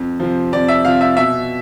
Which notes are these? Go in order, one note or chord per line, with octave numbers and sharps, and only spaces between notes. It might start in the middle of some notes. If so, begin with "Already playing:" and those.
Already playing: F2
C3 F3
F2 D5
E5
C3 F3 F5
E5
B2 E5